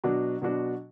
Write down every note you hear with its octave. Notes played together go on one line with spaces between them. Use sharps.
B2 F#3 D4 F#4
B2 F#3 D4 F#4